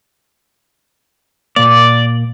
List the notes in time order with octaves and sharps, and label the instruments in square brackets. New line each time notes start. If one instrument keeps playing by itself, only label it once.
[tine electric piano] A#2 A#3 [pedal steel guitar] D5